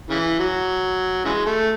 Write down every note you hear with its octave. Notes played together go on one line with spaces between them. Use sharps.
C#3 E3
F#3
C#3 E3 G#3
A3